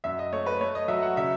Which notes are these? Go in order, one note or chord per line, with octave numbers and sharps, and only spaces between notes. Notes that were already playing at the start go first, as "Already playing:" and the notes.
F#2 E5
D#5
A3 C#5
B4
A3 C#5
D#5
F#3 E5
F#5
C#3 E5